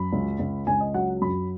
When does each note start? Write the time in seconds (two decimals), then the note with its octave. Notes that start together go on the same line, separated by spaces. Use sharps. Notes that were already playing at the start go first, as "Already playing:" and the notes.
Already playing: F#2 B5
0.12 C#2
0.39 C#2
0.67 C#2 G#5
0.80 D#5
0.94 F#3 F#5
1.22 F#2 B5